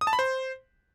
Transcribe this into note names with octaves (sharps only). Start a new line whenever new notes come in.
D#6
A5
B5
C5